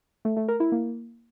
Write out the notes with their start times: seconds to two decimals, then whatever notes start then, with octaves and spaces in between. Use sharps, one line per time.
0.25 A3
0.37 A3
0.48 A#4
0.60 E4
0.72 A#3